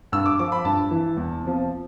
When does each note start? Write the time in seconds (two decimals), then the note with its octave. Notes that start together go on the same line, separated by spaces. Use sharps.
0.12 G2 E6
0.26 D6
0.39 F3 D6
0.52 B5
0.64 G2 A5
0.91 E3
1.17 E2
1.43 C3 F3